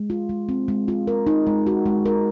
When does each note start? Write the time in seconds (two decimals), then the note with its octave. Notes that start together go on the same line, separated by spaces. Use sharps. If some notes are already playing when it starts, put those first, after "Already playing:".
Already playing: G#3
0.10 F4
0.29 G#3
0.49 C4
0.68 G#3
0.88 F4
1.07 A#4
1.27 D#4
1.47 G#3
1.67 F#4
1.86 G#3
2.06 A#4